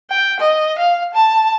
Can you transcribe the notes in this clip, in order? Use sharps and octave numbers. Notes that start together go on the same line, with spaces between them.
G5
D#5
F5
A5